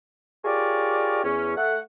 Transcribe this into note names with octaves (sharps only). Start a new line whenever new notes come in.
F4 G4 G#4 A#4 C#5 D5
E2 C#4
A3 F#5